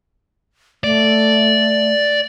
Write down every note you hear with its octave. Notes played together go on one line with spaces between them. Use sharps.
A3 D5